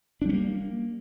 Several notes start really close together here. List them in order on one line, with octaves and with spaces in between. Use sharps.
D4 G3 C#4 A#3